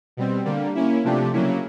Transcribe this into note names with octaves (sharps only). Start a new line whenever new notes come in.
B2 G3 C4
D3 G3 A#3
A#3 C#4 E4
C3 F3 A3 D4 G4
C#3 F#3 A#3 C#4 E4